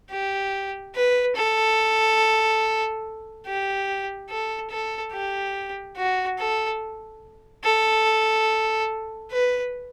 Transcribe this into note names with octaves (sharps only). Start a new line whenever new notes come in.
G4
B4
A4
G4
A4
A4
G4
F#4
A4
A4
B4